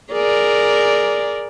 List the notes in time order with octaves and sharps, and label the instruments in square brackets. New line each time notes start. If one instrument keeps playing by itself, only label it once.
[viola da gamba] G#4 A#4 D5